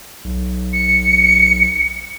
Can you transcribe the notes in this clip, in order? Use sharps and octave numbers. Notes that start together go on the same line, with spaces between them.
B1
C#7